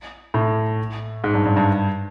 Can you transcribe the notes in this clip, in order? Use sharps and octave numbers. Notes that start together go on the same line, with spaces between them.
A2
G#2
G2
G2
G2